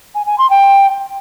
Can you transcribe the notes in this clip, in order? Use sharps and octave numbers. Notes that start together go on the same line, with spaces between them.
G#5
G#5
C6
G5